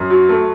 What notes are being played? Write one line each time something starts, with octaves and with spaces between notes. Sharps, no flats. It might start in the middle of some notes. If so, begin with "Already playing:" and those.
Already playing: F#2 C6
F#3
A3